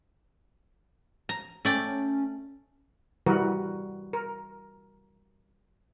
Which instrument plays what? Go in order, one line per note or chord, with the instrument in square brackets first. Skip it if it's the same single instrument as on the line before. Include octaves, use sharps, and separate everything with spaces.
[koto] A#5
[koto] A3 D5 G5 [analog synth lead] C#4
[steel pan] E3 G3 F#4 A#4 B4
A#4